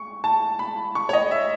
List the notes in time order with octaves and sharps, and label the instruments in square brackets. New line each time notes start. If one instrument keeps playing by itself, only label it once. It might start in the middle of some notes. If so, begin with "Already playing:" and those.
Already playing: [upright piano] C#6
A5
B5
C#6
C#5
D#5
E5